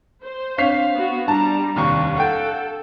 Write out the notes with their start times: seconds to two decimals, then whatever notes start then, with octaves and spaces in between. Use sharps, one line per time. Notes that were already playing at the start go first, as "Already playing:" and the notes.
0.24 C5
0.58 C4 D4 C#5 F5 B6 C7
0.94 B3 F#4
1.28 G3 D4 A5 A#5
1.76 F1 D#2 F5 C#6
2.16 A4 F#5 G5